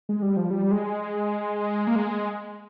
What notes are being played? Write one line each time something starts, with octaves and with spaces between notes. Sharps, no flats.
G#3
G3
F3
G3
G#3
A#3
G#3